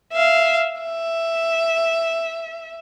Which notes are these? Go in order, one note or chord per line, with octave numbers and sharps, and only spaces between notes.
E5 F5
E5